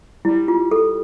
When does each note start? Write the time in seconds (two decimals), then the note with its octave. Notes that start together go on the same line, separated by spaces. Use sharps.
0.25 G3 E4
0.48 F4
0.71 A4